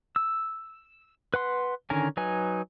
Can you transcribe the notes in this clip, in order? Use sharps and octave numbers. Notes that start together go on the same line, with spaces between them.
E6
B4 F#5 C6
D3 D#3 C#4 A#4 G#5
F#3 D#4 B4 G#5